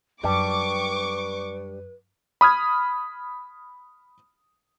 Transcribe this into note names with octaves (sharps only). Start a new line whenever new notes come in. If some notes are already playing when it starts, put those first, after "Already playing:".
F#2 G3 D4 G4 B4 C#6 D6
B5 D#6 F6 G#6